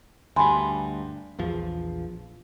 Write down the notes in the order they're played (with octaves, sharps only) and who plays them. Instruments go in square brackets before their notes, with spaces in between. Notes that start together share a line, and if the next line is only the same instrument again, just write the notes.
[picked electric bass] D2 G2 [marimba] G#5 B5 C6
[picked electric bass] A#1 E2 F3